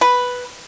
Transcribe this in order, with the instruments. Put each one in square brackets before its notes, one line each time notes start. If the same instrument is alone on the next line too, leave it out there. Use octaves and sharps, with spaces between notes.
[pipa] B4